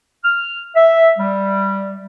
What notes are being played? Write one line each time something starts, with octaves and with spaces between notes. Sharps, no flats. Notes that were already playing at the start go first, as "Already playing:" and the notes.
F6
E5
G3